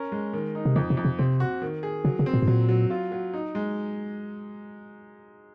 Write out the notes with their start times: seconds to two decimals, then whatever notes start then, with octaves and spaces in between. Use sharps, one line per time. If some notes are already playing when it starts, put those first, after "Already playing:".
Already playing: C#4 A#4
0.12 G#3
0.33 D#3
0.55 D#4
0.65 C3
0.76 F2 C#3
0.90 C3
0.97 F2
1.05 C3
1.19 C3 C4
1.40 F#4
1.62 D#3
1.83 G#4
2.05 C#3 F#3
2.19 C#3
2.26 C4
2.34 A#2
2.42 G#2
2.47 A#2 F#3
2.69 F#3
2.90 F4
3.12 F#3
3.33 D#4
3.55 G#3